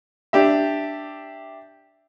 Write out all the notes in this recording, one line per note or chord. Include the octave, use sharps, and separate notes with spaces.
D4 G4 E5